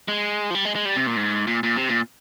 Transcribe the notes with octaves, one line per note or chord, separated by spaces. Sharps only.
G#3
F3
G3
G#3
G#3
G3
C3
A#2
G#2
A#2
A#2
C3
A#2